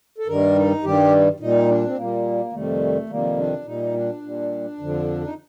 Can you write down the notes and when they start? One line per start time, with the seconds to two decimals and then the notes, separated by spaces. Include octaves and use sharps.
0.18 A4
0.27 G2 D#3 G3 A#4
0.56 D#4
0.83 G2 D#3 G3 G4
1.40 A#2 G3 D#4
1.68 D4
1.86 C4
1.96 A#2 G3 A#3
2.52 F2 C3 D#3 G3 A3
3.09 F2 C3 D#3 G3 A#3
3.37 D4
3.65 A#2 G3 D#4
3.94 D4
4.22 A#2 G3
4.78 F2 D3 F3
5.24 D#4